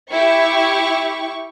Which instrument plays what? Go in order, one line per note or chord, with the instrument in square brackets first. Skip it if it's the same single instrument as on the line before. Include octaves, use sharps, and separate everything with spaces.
[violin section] E4 G4 C#6